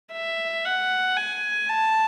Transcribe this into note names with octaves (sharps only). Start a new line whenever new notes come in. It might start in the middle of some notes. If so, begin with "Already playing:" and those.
E5
F#5
G#5
A5